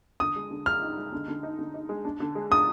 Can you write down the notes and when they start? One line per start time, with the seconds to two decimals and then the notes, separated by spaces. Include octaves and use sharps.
0.20 D3 D#6
0.36 G#3
0.51 D3
0.66 G#3 F6
0.82 D#4
0.97 G#3
1.12 D3
1.28 D3
1.43 D#4
1.59 D3
1.74 D#4
1.89 G#3
2.05 D4
2.20 D3
2.35 G#3
2.51 D4 D#6